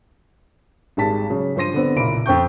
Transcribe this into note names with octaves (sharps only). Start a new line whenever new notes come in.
G#1 G3 G#3 A5 B6
C#3 F#3
G2 F3 C5 C6 A#6 D#7
D3 B3 C4
F#1 B1 A#2 A#3 B5 D7
F2 C5 G5 C#6 G6